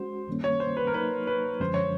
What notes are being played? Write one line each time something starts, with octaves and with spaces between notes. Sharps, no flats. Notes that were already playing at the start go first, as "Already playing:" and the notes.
Already playing: G#3 C#4 F#4 C5
G2 D#3 G3 A#3 C#4
C#5
C5
B4
A#4
F#3 A#3 D#4 B4
B4
F#2 D3 F3 G#3 C#4 C5
C#5